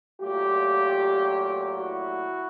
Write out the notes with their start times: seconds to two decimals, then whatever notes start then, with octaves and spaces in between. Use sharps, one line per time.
0.21 A#2 F#3 A3 F4 G4
1.75 E4 F#4